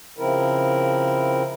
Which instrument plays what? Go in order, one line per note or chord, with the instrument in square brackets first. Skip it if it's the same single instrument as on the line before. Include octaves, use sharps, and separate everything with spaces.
[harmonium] C#3 F3 C4 E4 A#4